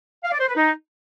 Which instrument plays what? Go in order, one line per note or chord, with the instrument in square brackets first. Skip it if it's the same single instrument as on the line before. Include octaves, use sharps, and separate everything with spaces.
[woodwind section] F5
D5
C5
B4
D#4